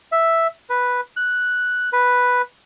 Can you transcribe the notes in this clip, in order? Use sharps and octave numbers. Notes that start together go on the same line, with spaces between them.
E5
B4
F#6
B4